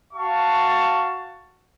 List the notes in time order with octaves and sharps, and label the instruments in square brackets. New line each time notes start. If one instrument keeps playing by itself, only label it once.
[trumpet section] F#4 F5 A5 C#6